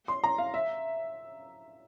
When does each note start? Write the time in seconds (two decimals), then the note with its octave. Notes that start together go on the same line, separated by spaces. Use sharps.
0.08 C6
0.24 A#5
0.38 F5
0.54 E5